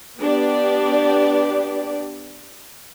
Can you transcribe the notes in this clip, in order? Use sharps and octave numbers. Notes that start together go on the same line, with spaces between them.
B3 D4 G4 D5